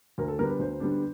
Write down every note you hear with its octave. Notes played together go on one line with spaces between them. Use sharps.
D2 A#4
A4
D3 G3 B3 D4 A#4
B4
D2 C5
D3 G3 B3 D4